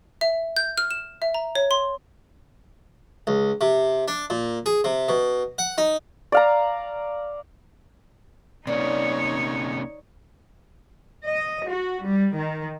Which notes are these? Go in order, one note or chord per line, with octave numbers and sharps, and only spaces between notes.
E5
G6
F6
E7
E5
A#5
C#5
C6
C#2
C3
D4
A#2
G#4
C3
B2
F#5
D#4
D5 F5 A#5
C3 A#3 C#4 D#4 C#5 D5
D#5
F#4
G3
D#3